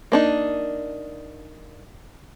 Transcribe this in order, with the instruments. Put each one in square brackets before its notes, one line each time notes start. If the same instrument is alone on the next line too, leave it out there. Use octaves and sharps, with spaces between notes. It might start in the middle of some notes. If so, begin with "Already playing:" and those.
[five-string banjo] A#3 D4 D#4